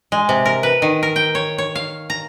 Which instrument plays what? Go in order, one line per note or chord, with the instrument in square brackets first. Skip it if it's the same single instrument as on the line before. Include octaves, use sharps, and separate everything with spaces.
[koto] G#3
C3
A#4
B4
D#3
A#4
G5
C#5
C#5
F5
A#5